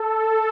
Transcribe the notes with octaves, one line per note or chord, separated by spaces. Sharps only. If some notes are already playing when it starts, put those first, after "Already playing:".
Already playing: A4